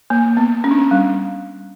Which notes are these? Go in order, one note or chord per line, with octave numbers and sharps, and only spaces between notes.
A#3
B3
C#4
D4
C#4
G3